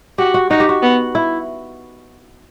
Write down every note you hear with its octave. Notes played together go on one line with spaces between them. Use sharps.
F#4 G4
F#4
D#4 F#4
G4
F#4
B3
E4